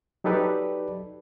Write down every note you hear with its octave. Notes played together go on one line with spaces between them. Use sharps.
F#3 D#4 G4 A4 B4 D5